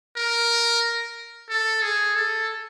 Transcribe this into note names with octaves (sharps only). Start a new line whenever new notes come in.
A#4
A4
G#4
A4